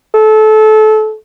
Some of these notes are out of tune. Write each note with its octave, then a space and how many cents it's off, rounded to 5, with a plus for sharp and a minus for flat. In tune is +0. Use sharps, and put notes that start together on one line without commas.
A4 -25